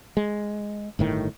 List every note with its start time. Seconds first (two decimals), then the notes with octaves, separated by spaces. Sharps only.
0.17 G#3
0.99 G1 A2 D#3